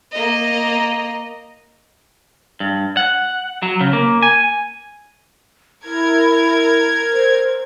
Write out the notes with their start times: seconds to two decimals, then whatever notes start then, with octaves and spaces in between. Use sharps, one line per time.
0.12 A#3 D#5
2.60 G2
2.97 F#5
3.63 F#3
3.81 C#3
3.93 A#3
4.23 G#5
5.84 E4 A#4 G#6
7.12 C5